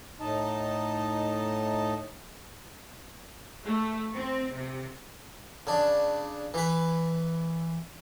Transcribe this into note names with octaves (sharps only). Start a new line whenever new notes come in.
A2 D#4 D#5 A5
A3
C4
C3
C#3 D4
E3 B4